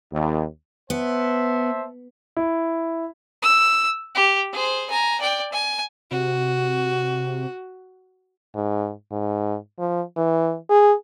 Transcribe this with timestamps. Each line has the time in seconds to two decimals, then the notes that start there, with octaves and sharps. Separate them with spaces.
0.13 D#2
0.90 B3 C5 E5 A5
2.37 E4
3.42 E6
4.15 G4
4.52 G#4 C5
4.90 G#5 A#5
5.21 D5 G5
5.52 G#5
6.11 C3 F#4
8.56 G#2
9.12 G#2
9.79 F3
10.17 E3
10.70 G#4